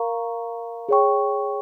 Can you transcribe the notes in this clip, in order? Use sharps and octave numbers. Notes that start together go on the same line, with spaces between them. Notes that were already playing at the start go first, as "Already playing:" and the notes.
Already playing: A#4 F5 A#5 C#6
G#4 C#5 G5 C#6